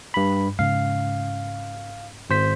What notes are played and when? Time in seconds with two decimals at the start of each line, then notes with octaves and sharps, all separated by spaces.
0.14 G2 B5
0.59 G#2 C#3 F5
2.30 G#1 C5 B6